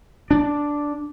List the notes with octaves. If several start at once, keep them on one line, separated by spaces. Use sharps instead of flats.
D4